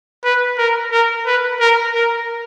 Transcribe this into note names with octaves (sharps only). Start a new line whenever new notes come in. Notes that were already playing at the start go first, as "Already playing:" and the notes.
B4
A#4
A#4
B4
A#4
A#4